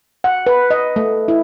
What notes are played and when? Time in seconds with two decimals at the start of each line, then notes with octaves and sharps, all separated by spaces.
0.24 F#5
0.47 B4
0.71 D#5
0.96 A3
1.28 E4